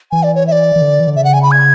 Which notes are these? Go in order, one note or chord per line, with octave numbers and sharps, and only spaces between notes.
E3 G#5
D5
C#5
E5
D5
E3
D3
E3
D3
C#3 E5
F#5
G#5
B5
G#6